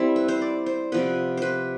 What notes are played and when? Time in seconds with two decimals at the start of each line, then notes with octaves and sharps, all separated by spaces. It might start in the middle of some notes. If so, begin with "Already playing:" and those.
Already playing: G3 C4 E4 E5
0.16 B4
0.28 C5
0.42 D5
0.66 C5
0.92 C3 F3 B3 B4
1.37 B4 C5